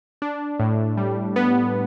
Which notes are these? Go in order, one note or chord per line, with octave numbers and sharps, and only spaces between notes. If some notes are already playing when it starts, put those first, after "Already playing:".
D4
A2
G3
B3